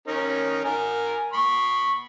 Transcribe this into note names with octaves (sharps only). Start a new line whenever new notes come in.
C#4 D#4 A#4
A#4 G#5
B5 C#6